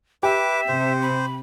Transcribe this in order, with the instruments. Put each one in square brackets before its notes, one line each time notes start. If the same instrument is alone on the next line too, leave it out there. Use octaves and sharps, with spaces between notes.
[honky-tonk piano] G4 [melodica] B4 D6 [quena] E5
[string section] C3 [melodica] C5
[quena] B5